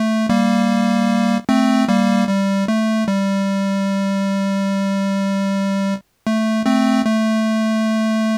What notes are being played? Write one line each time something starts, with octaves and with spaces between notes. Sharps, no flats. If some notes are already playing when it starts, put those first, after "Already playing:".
Already playing: A3
G3 A#3
A3 C4
G3 A#3
G3
A3
G3
A3
A3 C4
A3